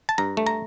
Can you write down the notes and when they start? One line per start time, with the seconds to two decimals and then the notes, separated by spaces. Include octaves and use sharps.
0.09 A5
0.18 G2 A#5
0.37 A3
0.46 A#5